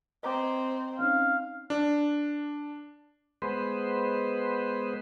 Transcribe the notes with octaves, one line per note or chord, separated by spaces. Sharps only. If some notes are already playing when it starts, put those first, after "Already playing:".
C4 D#5 A#5 D6
C4 C#4 D#4 F5
D4
G#3 B3 B4 C5